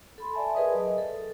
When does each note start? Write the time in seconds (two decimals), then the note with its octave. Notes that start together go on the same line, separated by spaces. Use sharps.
0.18 A4 B5 C6
0.33 D5 E5 G#5 A5
0.55 G#4 A#4 B4 D5 D#5 D#6
0.74 F#3
0.98 A4